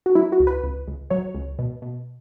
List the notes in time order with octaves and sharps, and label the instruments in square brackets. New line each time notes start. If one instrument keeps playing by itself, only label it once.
[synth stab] F#4
F#3 E4
F#4
C#2
B4
C#2
C#2
F#3 C#5
C#2
B2
B2